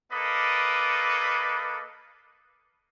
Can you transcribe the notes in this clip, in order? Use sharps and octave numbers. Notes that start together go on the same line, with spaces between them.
A#3 A4 B4 D5 D#5 D6